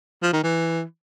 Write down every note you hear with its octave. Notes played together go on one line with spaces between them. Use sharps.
F3
D#3
E3